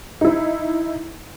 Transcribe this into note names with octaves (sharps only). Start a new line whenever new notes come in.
D#4 E4